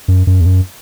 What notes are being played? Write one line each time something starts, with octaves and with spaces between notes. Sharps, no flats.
F#2
F#2
E2
F#2